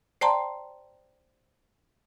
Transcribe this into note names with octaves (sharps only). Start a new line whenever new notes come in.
C5 D5 G5 A5 A#5 C6